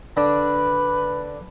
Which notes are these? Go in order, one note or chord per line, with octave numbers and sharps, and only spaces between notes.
D3 D4 B4